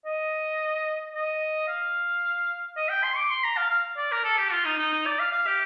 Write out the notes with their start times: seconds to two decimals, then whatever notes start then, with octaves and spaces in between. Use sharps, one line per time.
0.05 D#5
1.14 D#5
1.68 F5
2.76 D#5
2.89 G5
3.03 C6
3.17 D6
3.30 C6
3.44 A#5
3.57 F5
3.70 F5
3.97 D5
4.11 A#4
4.24 A4
4.38 G4
4.52 F4
4.65 D#4
4.78 D#4
4.93 D#4
5.06 D5
5.20 F5
5.32 F5
5.46 G4